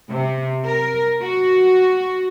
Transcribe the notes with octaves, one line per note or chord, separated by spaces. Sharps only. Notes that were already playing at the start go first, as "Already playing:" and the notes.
C3
A#4
F#4